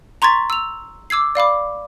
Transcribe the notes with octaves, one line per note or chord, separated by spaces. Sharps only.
A#5 C6 C#6 G#6 A6 B6
E6 F7
D6 E6 G#6 C7
D5 F5 B5 D6